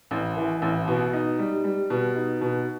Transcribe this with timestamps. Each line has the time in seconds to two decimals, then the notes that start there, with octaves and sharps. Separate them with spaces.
0.11 A1
0.36 E3
0.62 A1
0.87 B2
1.13 D#4
1.39 G3
1.64 G3
1.90 B2
2.16 D#4
2.41 B2